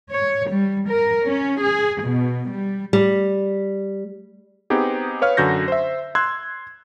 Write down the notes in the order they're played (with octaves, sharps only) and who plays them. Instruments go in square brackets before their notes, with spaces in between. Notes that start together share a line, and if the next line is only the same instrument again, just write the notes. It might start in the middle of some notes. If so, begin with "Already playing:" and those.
[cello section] C#5
G3
A#4
C#4
G#4
B2
G3
[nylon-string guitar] G3
[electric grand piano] B3 C4 D#4 G4 G#4
B4 C#5 F5 F6
F#2 D3 F#4 G6 A#6
C5 E5
C6 E6 F#6 G#6